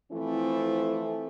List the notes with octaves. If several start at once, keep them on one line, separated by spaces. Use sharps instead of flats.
E3 F3 A3 C4 E4